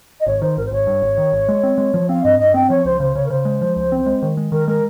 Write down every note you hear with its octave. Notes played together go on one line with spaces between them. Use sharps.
D#5
G#1 C#5
D#3 C5
G#1 A#4
C5
G#1 C#5
G2
G#1
D#3
G#1
G#3
C4
G#3
F3
C4 F5
G2 D#5
G2 D#5
C4 G5
F3 C#5
C#2 C5
C#3 C5
C#3 C#5
A#4
C#3 C5
G#3
F3
C#2
C4
G#3
D#3
G#3
D#3 A#4
G#3 A#4